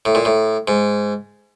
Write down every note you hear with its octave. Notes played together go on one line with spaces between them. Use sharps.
A2
A#2
A2
G#2